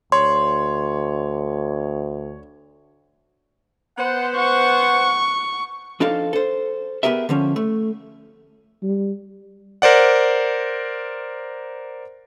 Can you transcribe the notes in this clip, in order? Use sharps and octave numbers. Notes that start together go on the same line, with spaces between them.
D2 C#5 C6
B3 C5 F#5
F#5 C#6
F3 D4 D#4 A4 F5
A4 C5
B3 G4 G#4 A#4 E5
D3 F3 C#4
A3
G3
A#4 C5 D5 F#5